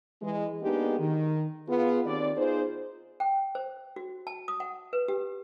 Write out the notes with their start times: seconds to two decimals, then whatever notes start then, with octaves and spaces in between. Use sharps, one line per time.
0.22 E3 G#3
0.61 G#3 A#3 B3 D4 D#4 G4
0.98 D#3
1.68 B3 F4 G#4
2.05 D#2 C4 D5
2.36 B3 D#4 F4 G#4 C5
3.20 G5
3.55 C5
3.96 F#4
4.27 A5
4.48 D#6
4.60 F#5
4.93 B4
5.08 G4